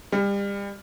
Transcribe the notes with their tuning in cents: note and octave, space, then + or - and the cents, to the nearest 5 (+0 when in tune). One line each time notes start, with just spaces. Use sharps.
G3 +35